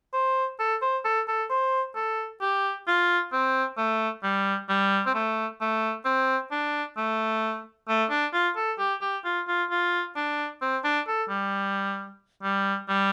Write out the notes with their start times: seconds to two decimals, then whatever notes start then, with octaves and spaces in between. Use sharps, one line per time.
0.13 C5
0.59 A4
0.82 C5
1.05 A4
1.28 A4
1.50 C5
1.95 A4
2.42 G4
2.87 F4
3.32 C4
3.77 A3
4.23 G3
4.69 G3
5.06 C4
5.14 A3
5.61 A3
6.05 C4
6.51 D4
6.97 A3
7.88 A3
8.10 D4
8.33 F4
8.56 A4
8.78 G4
9.01 G4
9.25 F4
9.48 F4
9.70 F4
10.16 D4
10.61 C4
10.84 D4
11.07 A4
11.29 G3
12.43 G3
12.89 G3